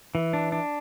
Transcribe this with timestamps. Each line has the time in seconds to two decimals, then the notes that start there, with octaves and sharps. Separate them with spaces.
0.15 E3
0.33 D4
0.52 D4